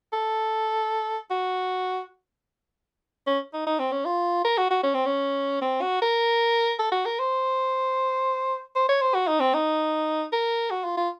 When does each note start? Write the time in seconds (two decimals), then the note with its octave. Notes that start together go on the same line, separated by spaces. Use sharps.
0.13 A4
1.31 F#4
3.27 C#4
3.54 D#4
3.66 D#4
3.79 C4
3.92 C#4
4.05 F4
4.45 A#4
4.58 F#4
4.70 F#4
4.83 C#4
4.94 C4
5.06 C#4
5.61 C4
5.82 F#4
6.02 A#4
6.79 A4
6.92 F#4
7.06 A#4
7.19 C5
8.75 C5
8.89 C#5
9.01 C5
9.14 F#4
9.27 D#4
9.40 C4
9.54 D#4
10.32 A#4
10.71 F#4
10.85 F4
10.97 F4